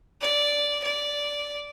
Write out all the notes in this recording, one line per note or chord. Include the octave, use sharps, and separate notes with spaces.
D5
D5